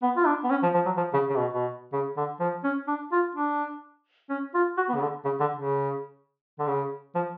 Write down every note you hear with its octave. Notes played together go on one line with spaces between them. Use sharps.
B3
F4
D4
B3
C#4
F3
F3
F#3
F3
C#3
C#3
B2
B2
C#3
D3
F3
C#4
D4
F4
D4
C#4
F4
F#4
B3
C#3
D3
C#3
D3
C#3
D3
C#3
F3